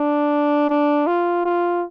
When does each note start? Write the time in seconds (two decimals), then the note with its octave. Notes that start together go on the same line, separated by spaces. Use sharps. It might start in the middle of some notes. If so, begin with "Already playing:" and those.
Already playing: D4
0.70 D4
1.07 F4
1.45 F4